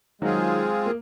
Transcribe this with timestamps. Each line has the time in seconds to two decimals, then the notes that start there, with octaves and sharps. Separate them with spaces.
0.22 D#3 F#3 G#3 C4 F4 G#4
0.86 A#3